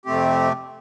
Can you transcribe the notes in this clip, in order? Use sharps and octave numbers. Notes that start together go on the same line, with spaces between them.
F2 C3 A3 C4 G4